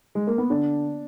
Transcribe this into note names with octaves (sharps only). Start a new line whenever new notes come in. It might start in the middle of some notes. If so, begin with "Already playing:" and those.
G#3
A#3
B3
D3 D4